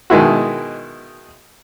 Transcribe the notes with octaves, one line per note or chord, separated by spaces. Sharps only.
B2 D#3 G#3 E4 F#4